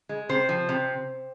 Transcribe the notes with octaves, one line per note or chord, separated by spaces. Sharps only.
G#3
C3 C5
F3
C3